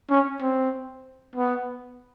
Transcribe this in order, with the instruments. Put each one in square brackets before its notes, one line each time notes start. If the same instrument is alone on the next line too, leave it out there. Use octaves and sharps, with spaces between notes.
[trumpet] C#4
C4
B3